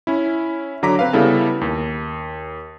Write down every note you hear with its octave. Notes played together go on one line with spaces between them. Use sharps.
C#4 E4
D3 F#3 A#5 D6 B6
C4 B4 F5
C#3 G3 B3 E4 A4
D#2